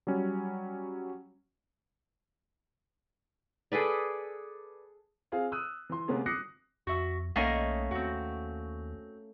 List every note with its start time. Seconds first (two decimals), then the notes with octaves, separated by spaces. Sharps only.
0.07 F#3 G3 C#4
3.72 G#4 A4 B4 D5
5.32 C4 F4 G#4 F5
5.52 D#6 E6 F#6 D#7
5.90 E3 C6
6.08 C3 G#3 A#3 B3 C#4 G#4
6.26 D6 D#6 F#6 A#6 C7 C#7
6.87 F2 F#4 E5
7.36 B1 D#3 A3 A#3 C#4 D#5 F#5
7.91 D#2 C4 F#4